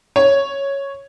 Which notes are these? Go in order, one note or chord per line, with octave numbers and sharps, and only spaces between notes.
C#5